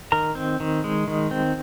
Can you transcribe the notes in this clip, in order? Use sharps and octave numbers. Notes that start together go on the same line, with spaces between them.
D#3 A#4 A#5
C4
D#3
G#3
D#3
C4